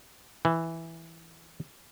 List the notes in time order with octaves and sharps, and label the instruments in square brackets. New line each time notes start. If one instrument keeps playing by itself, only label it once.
[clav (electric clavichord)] E3